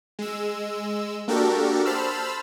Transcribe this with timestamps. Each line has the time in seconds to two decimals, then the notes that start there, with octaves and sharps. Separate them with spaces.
0.19 G#3 E6
1.28 A#3 D4 F#4 G4 A4 A#4
1.85 C5 A5 B5 E6 F6